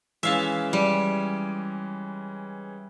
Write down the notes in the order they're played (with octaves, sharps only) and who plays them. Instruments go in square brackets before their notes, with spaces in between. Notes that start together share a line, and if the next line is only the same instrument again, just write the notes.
[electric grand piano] E3 G#3 C#4 [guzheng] E5 F5 A5
[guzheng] G3